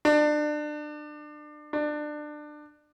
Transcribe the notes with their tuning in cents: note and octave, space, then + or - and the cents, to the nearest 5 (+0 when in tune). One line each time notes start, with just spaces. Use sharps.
D4 +30
D4 +25